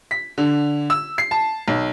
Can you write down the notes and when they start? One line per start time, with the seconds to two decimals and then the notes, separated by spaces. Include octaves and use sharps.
0.11 B6
0.38 D3
0.90 E6
1.18 C7
1.31 A5
1.68 B1